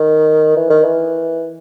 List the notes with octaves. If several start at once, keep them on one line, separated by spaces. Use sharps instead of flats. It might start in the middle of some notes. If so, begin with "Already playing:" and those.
Already playing: D#3
E3
D#3
E3